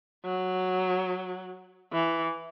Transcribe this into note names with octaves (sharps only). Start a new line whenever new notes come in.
F#3
E3